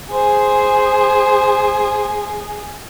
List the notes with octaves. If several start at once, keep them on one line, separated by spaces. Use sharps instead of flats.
G#4 C5